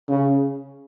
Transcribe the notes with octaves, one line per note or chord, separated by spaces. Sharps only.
C#3